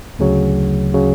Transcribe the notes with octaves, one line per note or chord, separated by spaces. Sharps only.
D2 C#3 F#3
C#3 F#3